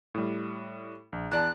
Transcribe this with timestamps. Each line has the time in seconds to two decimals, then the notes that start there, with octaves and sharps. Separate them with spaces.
0.14 A2 G3
1.12 A#1
1.31 E2 D5 A5 F#6